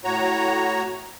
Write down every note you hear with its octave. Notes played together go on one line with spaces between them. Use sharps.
A2 F#4 C#5 A#5